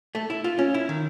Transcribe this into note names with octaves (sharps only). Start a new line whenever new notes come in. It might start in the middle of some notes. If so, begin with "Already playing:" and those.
A3
E4
F4
C#4
E4
D#3